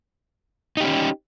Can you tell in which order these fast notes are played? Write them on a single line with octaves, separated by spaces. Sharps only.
D#4 G4 C#4